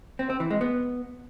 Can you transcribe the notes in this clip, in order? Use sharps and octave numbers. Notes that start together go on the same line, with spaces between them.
C4
C4
E3
G#3
B3